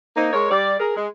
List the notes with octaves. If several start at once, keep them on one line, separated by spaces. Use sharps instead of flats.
A#3 C4 D#4
G#3 A#4 C#5
G3 D5
G#4 A#4
G#3